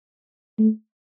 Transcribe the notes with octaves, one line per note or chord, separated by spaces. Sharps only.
A3